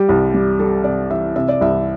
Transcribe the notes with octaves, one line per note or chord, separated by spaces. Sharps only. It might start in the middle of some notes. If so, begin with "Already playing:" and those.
Already playing: G3 G4
C2
G3
G3 A4
C3 D5
E3 E5
C3 E5
D5
C2 E5